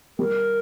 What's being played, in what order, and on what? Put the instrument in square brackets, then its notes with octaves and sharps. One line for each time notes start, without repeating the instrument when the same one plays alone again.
[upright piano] G3 [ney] A#4